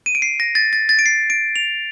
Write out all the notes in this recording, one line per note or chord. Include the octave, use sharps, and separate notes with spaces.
D#7
D7
C7
A#6
A6
A6
A6
D7
C7
D7
F7